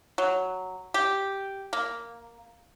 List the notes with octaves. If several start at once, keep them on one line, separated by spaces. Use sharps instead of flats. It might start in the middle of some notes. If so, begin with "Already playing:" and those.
F#3
G4
A#3